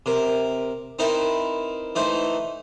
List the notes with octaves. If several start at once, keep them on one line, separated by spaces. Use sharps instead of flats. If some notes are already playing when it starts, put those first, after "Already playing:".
C3 A#4
C4 D#4 E4 A#4 B4
E3 A3 D#4 C5